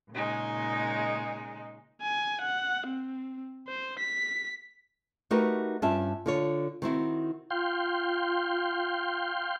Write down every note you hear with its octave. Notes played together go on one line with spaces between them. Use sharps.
A#2 C#3 G#3 D#4
G#5
F#5
C4
C5
B6
A3 D#4 F#4 G4 A#4 B4
G2 C#4 F4 E5 A5
D3 F4 C#5
D#3 C4 E4 F#4
F4 F5 G5 C6